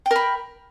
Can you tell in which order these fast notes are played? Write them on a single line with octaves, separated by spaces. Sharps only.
G5 A#4 B5